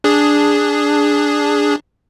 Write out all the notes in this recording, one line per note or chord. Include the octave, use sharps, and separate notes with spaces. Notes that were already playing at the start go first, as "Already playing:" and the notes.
D4 G#4